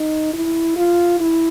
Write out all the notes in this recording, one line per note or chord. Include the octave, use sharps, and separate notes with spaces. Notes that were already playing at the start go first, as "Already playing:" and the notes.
Already playing: D#4
E4
F4
E4